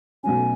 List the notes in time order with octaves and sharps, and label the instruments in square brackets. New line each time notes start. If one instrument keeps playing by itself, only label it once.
[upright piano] B1 B2 F#3 A3 C#4 [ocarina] G#5